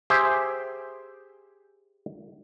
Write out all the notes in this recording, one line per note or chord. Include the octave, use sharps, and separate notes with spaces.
G4 G#4 C5 E5 G5